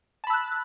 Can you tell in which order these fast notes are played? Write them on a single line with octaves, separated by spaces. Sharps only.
A5 B5 E6 F#6